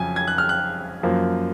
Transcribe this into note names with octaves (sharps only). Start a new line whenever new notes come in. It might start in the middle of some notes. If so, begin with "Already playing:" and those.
Already playing: F2 C#3 F#3 G#5
G#6
F#6
F6
F#6
F#2 F3 A#3